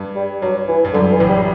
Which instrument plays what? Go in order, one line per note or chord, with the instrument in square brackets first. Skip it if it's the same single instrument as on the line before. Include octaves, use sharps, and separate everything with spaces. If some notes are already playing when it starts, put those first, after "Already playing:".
Already playing: [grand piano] G2
[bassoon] G3
[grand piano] G2 [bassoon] F#3
[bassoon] E3
[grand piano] G2
[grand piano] F#2 [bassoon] D3
[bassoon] E3
[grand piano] A1 A2
[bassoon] G3